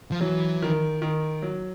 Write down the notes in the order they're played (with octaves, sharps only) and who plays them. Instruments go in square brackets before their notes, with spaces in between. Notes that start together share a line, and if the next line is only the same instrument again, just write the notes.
[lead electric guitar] F3
[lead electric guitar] E3 [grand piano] F#3
[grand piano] D#3
D#3
F#3